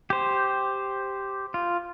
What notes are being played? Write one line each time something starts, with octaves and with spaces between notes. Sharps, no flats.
G4 C5
F4